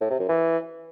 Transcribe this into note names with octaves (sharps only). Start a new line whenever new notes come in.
A2
C3
F#2
E3